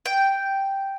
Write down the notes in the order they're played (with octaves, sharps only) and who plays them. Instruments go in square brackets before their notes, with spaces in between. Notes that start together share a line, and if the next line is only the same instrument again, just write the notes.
[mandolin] G5